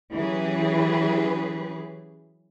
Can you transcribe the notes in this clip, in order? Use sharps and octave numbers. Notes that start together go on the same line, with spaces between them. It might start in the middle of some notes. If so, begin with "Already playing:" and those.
E3 F#3 C#4 G4 G#4 B4